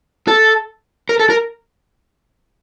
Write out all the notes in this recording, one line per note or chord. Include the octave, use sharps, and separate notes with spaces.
A4
A#4
A4
A#4